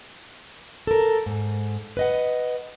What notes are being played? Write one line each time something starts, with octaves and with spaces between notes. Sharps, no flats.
A4 A#4
G#2
B4 D#5 F#5